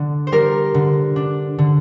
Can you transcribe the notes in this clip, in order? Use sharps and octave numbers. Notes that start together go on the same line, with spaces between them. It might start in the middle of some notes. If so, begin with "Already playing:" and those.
Already playing: D3 D4
C5
G3 A#4
D3
D4
D3